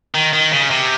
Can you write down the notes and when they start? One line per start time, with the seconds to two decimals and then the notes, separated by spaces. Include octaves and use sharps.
0.15 D#3
0.33 D#3
0.52 C#3
0.70 C3